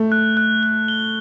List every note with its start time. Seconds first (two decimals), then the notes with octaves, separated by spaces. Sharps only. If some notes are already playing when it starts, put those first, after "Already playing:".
Already playing: A3
0.12 F#6
0.37 F#6
0.63 F#6
0.88 G7